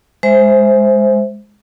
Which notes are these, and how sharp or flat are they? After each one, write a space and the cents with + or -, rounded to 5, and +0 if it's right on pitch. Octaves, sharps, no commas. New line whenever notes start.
G#3 +0 C5 +0 E5 +0